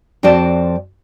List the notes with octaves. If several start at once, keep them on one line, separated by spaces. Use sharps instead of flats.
F2 C4 F#4 C5 D5 A5